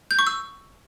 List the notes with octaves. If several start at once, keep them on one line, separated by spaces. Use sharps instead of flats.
G6
C#6
E6